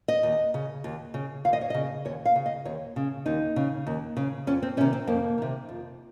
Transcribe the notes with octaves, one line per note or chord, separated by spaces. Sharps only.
D#5
D#2
C#3
D#2
C#3
D#2 F5
D#5
C#5
C#3 D#5
D#2 C#5
F5
C#3
D#5
D#2 C#5
C#3
D#2 D#4
C#3
D#2
C#3
F2 C#4
C4
C3 D#3 C#4
C4
F2 A#3
C3 D#3
F2